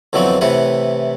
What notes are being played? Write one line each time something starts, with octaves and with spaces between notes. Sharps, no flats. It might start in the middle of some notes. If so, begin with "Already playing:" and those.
F2 D3 E3 F#3 B3 C4
A2 C3 E3 B4 F#5